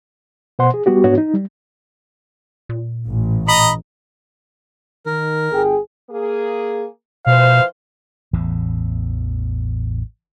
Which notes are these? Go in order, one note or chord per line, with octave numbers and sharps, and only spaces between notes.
B2 C5 F#5 C6
G#4
G3 B3 F#4 G4
G#2 B3 D4 F#4 C#5
D#4
G3
A#2
A1
D#5 A#5 B5
D#3 A#4
G1 G#4 G5
A#3 G#4
B2 E3 F3 C5 F5
A1 E2 A2 C#3